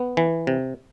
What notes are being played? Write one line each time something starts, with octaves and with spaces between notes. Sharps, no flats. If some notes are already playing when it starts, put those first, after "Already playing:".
Already playing: B3
E3
C3